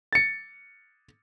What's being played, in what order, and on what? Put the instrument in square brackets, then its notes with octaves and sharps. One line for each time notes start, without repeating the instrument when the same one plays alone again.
[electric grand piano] A6 C#7